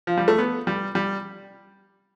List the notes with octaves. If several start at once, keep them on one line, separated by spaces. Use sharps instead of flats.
F3
G3
A3
B3
G3
G3